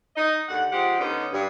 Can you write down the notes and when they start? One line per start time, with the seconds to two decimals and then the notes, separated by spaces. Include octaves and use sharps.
0.15 D#4 D#5
0.48 D#2 D3 F#5
0.71 F3 G#3 G4 F#5
0.99 D3 B3 C#4 D#4
1.31 G2